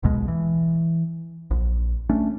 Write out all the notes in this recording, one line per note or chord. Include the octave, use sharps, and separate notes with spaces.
D#1 B1 B2 G#3
E3
A#1
A3 C#4 D4